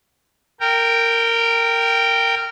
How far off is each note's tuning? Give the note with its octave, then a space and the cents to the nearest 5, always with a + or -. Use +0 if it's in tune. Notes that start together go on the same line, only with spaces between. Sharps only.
A#4 -15 G5 +0